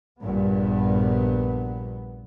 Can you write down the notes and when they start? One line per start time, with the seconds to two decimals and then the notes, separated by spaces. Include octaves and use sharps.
0.22 A#1 G2 A#2 B3